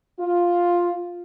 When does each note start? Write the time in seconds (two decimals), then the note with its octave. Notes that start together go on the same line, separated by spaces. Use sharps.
0.20 F4